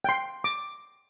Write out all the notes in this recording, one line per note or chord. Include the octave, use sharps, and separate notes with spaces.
G5 C6
D6